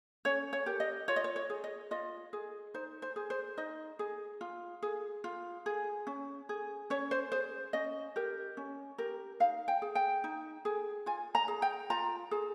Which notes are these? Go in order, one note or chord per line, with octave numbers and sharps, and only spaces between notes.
C#4 C#5
C#5
G4 A#4
D#5
F4 C#5
D#5
C#5
C#5
G#4
D#5
F4 D#5
G#4
D#4 C5
C5
G#4
C5
D#4 D#5
G#4
F4
G#4
F4
G#4
C#4
G#4
C#4 C#5
C5
G#4 C5
C#4 D#5
G4 A#4
C#4
G4 A#4
D#4 F5
G5
G#4
G5
D#4
G#4
F4 G#5
A#5
G#4
G5
F4 A#5
G#4